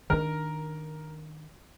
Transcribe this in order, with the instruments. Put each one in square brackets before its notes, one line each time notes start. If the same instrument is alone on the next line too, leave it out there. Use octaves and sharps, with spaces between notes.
[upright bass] D#3 D4 [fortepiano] A#4 A#5